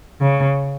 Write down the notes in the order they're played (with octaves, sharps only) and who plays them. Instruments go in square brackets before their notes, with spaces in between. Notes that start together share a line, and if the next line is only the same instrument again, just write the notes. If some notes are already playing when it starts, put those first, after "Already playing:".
[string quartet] C#3